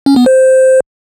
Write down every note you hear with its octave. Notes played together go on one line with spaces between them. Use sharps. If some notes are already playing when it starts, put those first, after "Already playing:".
C#4
B3
C5